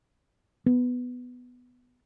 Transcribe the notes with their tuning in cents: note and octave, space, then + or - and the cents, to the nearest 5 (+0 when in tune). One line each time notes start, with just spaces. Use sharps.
B3 +5